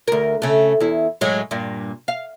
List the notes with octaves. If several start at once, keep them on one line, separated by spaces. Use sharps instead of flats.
D2 A#4
C#3 A3
E2 E4
A2 F#3 G#3
G2 A#2
F5